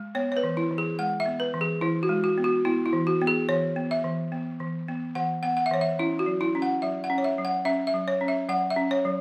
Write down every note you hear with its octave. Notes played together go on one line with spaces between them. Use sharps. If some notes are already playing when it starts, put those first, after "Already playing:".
Already playing: G#3
B3 C#5
C#5
B4
E3
E4
E3
G#4
G#3 F#5
E5
B3
B4
E3
G#4
E3 E4
F#4
G#3
F#4
B3
F#4
B3 E4
E4
E3
F#4
B3
G#4
E3 C#5
B3
E5
E3
B3
E3
B3
E3 F#5
B3 F#5
F#5
E5
E3 C#5
E5
C#4 E4
F#4
F#3
E4
C#4
F#5
F#3 E5
F#5
C#4
C#5
E5
F#3
F#5
C#4 E5
E5
F#3
C#5
C#4
E5
F#3 F#5
E5
C#4
C#5
F#3